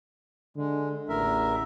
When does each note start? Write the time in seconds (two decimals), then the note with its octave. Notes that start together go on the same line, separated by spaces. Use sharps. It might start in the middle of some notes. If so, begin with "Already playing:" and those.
0.57 D3 G#3
1.09 A1 E2 A#4 E5